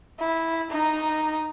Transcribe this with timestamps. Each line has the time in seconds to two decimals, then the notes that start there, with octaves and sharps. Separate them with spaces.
0.19 E4
0.71 D#4 A#5